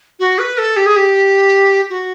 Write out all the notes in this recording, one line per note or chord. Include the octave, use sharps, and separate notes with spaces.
F#4
B4
A4
G4
G#4
G4
F#4